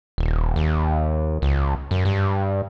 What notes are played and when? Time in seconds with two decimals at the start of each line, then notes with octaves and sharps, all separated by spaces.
0.18 D#1
0.56 D#2
1.42 C#2
1.91 F#2
2.05 G2